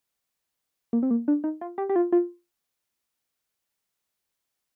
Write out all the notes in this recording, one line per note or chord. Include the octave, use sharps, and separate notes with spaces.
A#3
C4
A#3
D4
D#4
F4
G4
G4
F4
F4